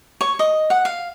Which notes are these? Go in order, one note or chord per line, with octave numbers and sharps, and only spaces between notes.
C#5
D#5
F#5
F5